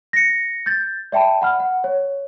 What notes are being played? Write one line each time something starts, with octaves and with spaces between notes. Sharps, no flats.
A#6 C#7
G6 A6
D5 E5 G5 A5 B5
F#5 B5 F6
F#5
C#5